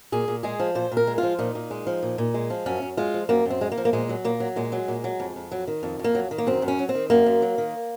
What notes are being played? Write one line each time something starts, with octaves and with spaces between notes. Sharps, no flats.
A#2 G#4
A#2
G#3 G#4
F3
A#2 C5
A#2
A#4
G#3
F4
F3
A#2 D#4
A#2
G#3
F3
A#2
A#2
G#3
F3
F#2 C#4
F#2
G#3 F4
F3
F#2 A#3
F#2
C4
G#3
A#3
F3
A#3
A#2 G#3
F#3
A#2 A#3
F#3
A#2 G#3
F#3
A#2
F#3
F2
F2
F#3
D#3
F2
F2
A#3
F#3
D#3
A#3
F#2 C4
F#2
C#4
F#3
C4
D#3
F#2 A#3
F#2
F#3
D#3